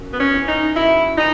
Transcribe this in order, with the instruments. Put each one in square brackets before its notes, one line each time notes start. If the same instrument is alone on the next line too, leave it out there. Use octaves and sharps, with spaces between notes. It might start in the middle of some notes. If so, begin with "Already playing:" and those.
Already playing: [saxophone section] F#2
B3
C#4
E3
D#4
F#2 E4
E3 D#4